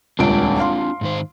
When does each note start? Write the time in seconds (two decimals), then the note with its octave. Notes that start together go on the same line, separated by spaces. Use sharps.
0.19 D#1 C#2 C4 D4 F4 D7
0.60 F5 C6
1.01 G#2 D#3 C5